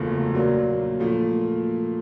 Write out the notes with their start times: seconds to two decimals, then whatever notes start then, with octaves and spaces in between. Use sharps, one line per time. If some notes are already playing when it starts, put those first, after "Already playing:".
Already playing: F#1 E2 C#3 F3 A3
0.34 A#2 F#3 A#3 D4
1.00 A#2 F3 A3